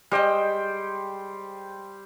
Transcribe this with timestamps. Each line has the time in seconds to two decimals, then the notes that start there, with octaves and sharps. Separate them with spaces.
0.11 G3 G#3 C5 D#5 G5